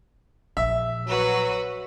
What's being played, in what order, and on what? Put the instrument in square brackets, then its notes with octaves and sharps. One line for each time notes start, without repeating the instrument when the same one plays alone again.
[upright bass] A#1 [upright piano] E5
[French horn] F#3 [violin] F#4 B4